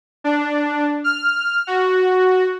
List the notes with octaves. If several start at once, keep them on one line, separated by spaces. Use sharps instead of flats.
D4
F6
F#4